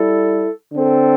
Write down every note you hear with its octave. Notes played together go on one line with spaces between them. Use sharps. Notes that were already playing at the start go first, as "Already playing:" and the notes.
Already playing: G3 E4 A4
D3 C4 A4